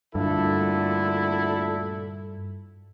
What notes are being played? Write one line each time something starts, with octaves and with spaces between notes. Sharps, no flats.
D2 G2 A#2 D3 E4 A4